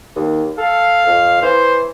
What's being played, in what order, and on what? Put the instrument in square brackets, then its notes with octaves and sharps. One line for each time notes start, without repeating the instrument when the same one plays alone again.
[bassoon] D#2
[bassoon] A4 [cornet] F5
[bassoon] F2
[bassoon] E3 [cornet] C5